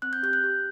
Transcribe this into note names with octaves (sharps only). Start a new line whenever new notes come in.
C4 F#6
G6
G4 G6
F#6
G4